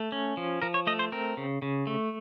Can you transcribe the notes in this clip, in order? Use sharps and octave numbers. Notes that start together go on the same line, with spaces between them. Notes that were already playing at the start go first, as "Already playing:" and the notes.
Already playing: A3
C#4
F3
F3 A#4
C#5
A3 D#5
C5
C4 A#4
C#3
C#3
A3